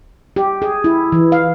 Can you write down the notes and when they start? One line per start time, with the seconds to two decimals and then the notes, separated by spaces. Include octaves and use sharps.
0.36 G4
0.62 G#4
0.84 E4
1.12 E3
1.32 F5